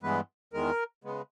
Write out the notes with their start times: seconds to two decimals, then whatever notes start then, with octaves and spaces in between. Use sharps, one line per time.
0.03 G2 E3 G#3 B3 B4
0.53 E2 D#3 G#3 A#4
1.04 C#3 G#3 B3